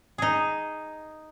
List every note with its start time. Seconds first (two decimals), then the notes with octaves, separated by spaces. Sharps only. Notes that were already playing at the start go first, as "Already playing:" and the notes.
0.18 D#4 G#4